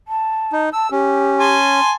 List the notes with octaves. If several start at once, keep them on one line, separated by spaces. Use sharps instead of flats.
A5
D#4
A5 E6
C#4 G4
G#5 A5 C6